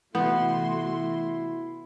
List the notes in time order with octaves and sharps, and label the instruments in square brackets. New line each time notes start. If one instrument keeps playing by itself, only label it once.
[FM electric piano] C3 E3 [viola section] A3 F#4 C6 [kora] B3 [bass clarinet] E4